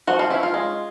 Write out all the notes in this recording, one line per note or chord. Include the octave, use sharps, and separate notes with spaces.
F3 F#4
F4
C#4 E4
F4
G#3